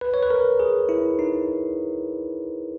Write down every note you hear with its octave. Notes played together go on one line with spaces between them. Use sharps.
B4
C#5
B4
A#4
G#4
E4
D#4